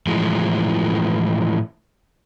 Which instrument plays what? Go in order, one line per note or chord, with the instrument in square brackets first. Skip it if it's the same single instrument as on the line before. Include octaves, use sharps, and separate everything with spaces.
[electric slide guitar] A2 E3 F3 G#3